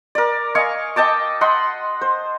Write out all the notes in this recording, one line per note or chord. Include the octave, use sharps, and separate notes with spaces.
A#4 D5
D#5 F5 G#5 C#6
D#5 G5 A5 D6
D#5 F#5 B5 C6
C5